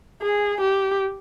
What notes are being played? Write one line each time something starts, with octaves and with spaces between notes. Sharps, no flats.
G#4
G4